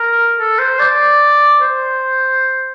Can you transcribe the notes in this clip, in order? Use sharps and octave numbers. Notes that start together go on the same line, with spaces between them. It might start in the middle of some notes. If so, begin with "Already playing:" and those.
Already playing: A#4
A4
C5
D5
C5